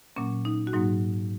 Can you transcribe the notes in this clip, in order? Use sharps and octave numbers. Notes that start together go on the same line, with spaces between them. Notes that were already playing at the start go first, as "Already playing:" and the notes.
A#2 F#3 A#3 C#4
D#4
F#4
G#2 F#3 A#3 D#4